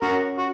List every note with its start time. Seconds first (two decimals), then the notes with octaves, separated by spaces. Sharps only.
0.02 C#4 F#4 A#4
0.38 F#4